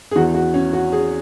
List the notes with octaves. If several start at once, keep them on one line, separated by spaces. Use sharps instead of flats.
G#4
E2 E3 F#4
F#4
C#4
F#4
G#4